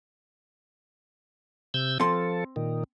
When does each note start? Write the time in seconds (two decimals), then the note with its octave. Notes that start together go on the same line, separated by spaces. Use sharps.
1.74 C3 E6 G6
2.00 F3 C4 A4 C6
2.56 A#2 D#3